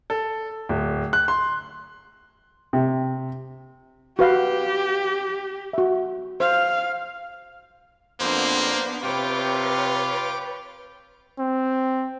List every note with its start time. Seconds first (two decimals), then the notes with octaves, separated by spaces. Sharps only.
0.10 A4
0.69 D1
1.13 F#6
1.28 C6
2.73 C3
4.19 F#4 G4 B4 F5
5.73 F#4 E5
6.40 C5 F5
8.20 F2 A#3 B3 D4 C5
9.04 C3 F4 B4 C#5 G5 D6
11.39 C4